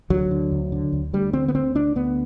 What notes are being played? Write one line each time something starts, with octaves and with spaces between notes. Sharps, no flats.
D2 F#3
D3
D2
D3
D2
D2 G3
D3 C4
B3
D2 C4
D2 D4
D2 B3